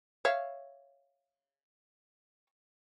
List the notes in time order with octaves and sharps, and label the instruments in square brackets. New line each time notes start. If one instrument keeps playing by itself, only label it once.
[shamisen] C#5 E5 F5